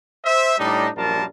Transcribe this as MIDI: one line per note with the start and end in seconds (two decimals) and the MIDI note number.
0.25 0.56 72
0.25 0.56 76
0.58 0.89 45
0.58 0.89 55
0.58 0.89 62
0.58 0.89 63
0.96 1.25 34
0.96 1.25 42
0.96 1.25 55
0.96 1.25 65
0.96 1.25 70
0.96 1.25 81